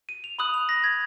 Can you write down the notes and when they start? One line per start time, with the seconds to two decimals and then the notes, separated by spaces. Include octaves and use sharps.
0.09 D#7
0.24 F7
0.39 B5 D#6 F#6 F#7
0.54 F7
0.69 A#6
0.84 G#6